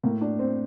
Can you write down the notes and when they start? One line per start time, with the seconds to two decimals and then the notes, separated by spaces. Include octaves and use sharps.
0.03 A2 A#3
0.21 D4
0.39 C4